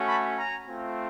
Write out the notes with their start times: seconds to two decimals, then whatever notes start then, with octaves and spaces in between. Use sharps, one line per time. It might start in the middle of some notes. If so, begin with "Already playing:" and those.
Already playing: A3 C#4 F#4
0.08 A5 B5
0.38 G#5 A#5
0.68 A3 C4 F4